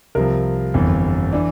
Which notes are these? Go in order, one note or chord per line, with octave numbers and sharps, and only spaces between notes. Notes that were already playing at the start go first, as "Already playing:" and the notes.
C2 C3 F3 A#4
G1 F2 E3
E3 D4